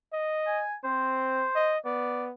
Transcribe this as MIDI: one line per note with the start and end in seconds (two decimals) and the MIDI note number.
0.13 0.65 75
0.47 0.76 80
0.84 1.45 60
0.84 1.73 72
1.56 1.79 75
1.85 2.33 59
1.85 2.26 74